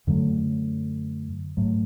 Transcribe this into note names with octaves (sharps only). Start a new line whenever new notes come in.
F#2 D3 F#3 A3
G#2 F#3 A3